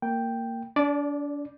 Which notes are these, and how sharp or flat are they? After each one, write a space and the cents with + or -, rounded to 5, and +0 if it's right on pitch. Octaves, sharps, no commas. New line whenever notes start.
A#3 -15 G5 +0
D4 -35 D5 +0